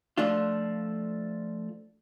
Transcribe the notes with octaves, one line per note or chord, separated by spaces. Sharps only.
F3 A3 D4 F4